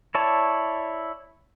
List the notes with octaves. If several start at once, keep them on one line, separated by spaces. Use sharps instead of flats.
E4 C#5 D5 A5